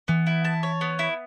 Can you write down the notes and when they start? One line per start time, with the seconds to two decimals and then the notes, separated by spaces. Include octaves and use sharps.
0.08 E3 B3
0.27 E4
0.45 A5
0.63 C#5
0.81 B3
0.99 E4